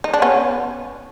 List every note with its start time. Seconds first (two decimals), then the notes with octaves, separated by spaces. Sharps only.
0.04 D#4
0.14 D4
0.22 B3 C#4